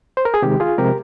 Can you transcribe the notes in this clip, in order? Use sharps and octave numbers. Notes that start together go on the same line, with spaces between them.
C5
A#4
G#4
C3 D#3 G#3 G4
F4 G#4
C3 F3 G#3 G4 A#4